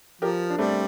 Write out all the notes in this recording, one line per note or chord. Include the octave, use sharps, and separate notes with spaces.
F3 G4 A#4
D4
G3 A3 C4